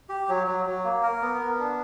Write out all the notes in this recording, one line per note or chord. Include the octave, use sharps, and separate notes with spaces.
G4
F#3
F#3
F#3
A#3
A#4
B3
B3
D4